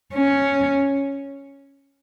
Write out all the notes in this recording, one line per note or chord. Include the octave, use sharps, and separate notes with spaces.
C#4